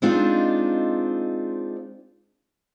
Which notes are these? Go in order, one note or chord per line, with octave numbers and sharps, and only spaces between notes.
G#3 C4 D4 D#4 F4